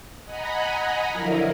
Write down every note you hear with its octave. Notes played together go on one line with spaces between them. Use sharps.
D#5 F#5 G#5 A#5 B5
D3 F3 F#3 E4 F4 A#4